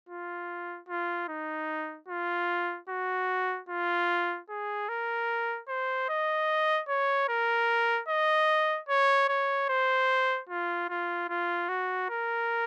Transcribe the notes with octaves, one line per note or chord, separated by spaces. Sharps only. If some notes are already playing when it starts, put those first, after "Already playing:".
F4
F4
D#4
F4
F#4
F4
G#4
A#4
C5
D#5
C#5
A#4
D#5
C#5
C#5
C5
F4
F4
F4
F#4
A#4